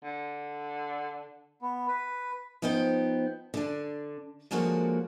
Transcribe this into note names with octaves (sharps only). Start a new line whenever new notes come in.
D3
B3
B4
F3 B3 D#4 C5 G5
D3 D4
D3 F3 G#3 A#3 F#4 C#5